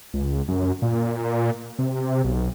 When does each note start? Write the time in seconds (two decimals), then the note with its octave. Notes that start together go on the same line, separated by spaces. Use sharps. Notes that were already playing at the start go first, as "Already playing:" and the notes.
0.14 C#2
0.48 F#2
0.82 A#2
1.79 C3
2.24 B1